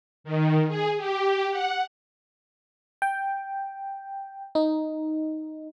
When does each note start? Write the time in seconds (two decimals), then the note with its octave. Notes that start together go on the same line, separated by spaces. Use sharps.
0.24 D#3
0.68 G#4
0.97 G4
1.51 F#5
3.02 G5
4.55 D#4